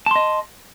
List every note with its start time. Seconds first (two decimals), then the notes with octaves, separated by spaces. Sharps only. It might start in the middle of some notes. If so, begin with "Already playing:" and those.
0.06 A5
0.11 C6
0.16 D#5